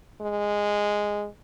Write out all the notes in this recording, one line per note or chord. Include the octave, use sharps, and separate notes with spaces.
G#3